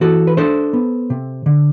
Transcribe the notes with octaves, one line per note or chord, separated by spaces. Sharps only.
E3 F#4 A4
B4
D4 A4 C5
B3
C3
D3